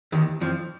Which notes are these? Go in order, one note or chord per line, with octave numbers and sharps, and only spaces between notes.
D#2 D#3
F2 F3